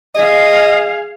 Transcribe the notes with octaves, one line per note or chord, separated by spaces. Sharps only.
G#4 D#5 F5